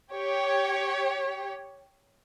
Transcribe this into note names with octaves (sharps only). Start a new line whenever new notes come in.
G4 C#5